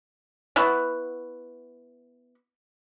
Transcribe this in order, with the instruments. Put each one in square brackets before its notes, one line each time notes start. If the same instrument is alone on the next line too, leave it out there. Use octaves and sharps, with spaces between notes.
[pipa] B3 E4 F#4